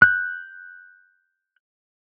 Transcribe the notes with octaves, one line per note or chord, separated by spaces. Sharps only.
F#6 G6